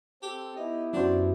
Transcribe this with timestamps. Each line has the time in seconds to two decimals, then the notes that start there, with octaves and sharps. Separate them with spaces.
0.23 C4 G4 A4
0.57 B3 D#4 E4 G4
0.93 F#2 D4 F#4 C5